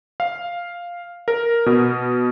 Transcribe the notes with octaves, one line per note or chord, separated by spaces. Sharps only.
F5
A#4
B2